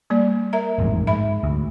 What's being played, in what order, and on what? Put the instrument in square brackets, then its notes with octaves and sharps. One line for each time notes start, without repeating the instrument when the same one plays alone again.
[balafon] G3 A#3 D5
A#4 E5 A#5
[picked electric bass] A1 F2 G#2
[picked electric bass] G#2 [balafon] E5 B5
[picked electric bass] D2